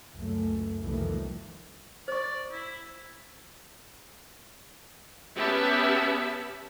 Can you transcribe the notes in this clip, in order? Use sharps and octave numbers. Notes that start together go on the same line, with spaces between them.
C#2 F#2 A3
C2 F2 D#3 E3 G3 A3
C5 D5 C#6
E4
B3 C#4 G4 E5 A5 B5